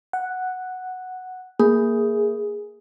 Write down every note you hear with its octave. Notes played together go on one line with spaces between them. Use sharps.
F#5
A#3 G#4